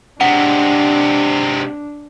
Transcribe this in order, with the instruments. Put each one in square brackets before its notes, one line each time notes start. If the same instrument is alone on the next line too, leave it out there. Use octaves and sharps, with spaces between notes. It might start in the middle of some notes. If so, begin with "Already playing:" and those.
[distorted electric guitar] C3 G#3 [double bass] D4 [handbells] F#5